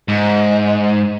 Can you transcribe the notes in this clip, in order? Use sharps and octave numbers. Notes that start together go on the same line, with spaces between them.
G#2